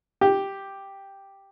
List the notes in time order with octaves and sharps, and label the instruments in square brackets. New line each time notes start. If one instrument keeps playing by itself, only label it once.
[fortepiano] G4